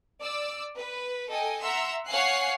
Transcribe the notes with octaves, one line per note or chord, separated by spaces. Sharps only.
D5 E6
B4
A4 D#5 G5 G#5
E5 F#5 A#5 C6 E6
C#5 F5 F#5 G#5 F#6 C7